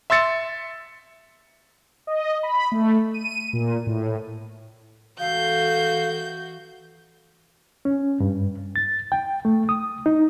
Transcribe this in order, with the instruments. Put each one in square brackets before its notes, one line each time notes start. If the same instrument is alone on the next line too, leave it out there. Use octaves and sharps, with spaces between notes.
[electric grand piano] E5 C6 E6 A6 C#7
[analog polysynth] D#5
B5
A3
D#7
A#2
A2
[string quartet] E3 F#4 [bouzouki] G#3 A3 A4 [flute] F5 [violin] G6
[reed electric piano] C#4
G2
A6
G5
A3
D#6
D#4